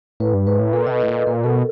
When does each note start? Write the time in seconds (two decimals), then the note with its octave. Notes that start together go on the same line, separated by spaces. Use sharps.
0.20 A2 B4
0.34 G2
0.47 G#2 B4
0.59 A2
0.73 A#2 A4
0.87 C3 D#5
0.91 B2
1.00 A2 D#5
1.08 A#2 B4
1.27 A#2 A#4
1.44 B2 A4